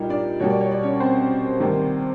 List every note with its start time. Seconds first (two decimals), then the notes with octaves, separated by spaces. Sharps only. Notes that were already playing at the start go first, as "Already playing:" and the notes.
Already playing: A#2 G3 D#4 A#4
0.09 D4 D5
0.40 B2 G3 A#3 C#5
0.50 D5
0.61 C#5
0.71 D5
0.83 C#4 C#5
1.00 C4 C5
1.60 C3 D#3 G3 A#3